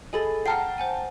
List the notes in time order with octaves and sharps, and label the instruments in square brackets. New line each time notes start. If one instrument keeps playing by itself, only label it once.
[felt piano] G#4 A4 D#5 [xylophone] G#5 B5 A6
[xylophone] F#5 F6 C7 [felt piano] G5 A5 A#5
[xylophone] C5 F#5 G#5